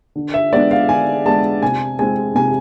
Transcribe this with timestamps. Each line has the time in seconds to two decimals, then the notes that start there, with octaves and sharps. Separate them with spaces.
0.16 D3
0.34 E5
0.53 G#3 B3 D4 D5
0.71 F5
0.89 D3 G#5
1.25 G#3 B3 D4 A5
1.62 C3 G#5
1.99 G#3 C4 G#5
2.35 C3 G#5